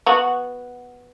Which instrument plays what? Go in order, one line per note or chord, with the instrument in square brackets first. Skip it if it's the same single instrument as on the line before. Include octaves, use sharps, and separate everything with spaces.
[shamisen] B3 F#4